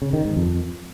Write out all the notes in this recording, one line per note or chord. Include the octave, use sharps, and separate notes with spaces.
C#3
D#3
G#2
F2